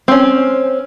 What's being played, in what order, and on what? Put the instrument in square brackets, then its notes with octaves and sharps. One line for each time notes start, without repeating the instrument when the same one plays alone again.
[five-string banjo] C4 C#4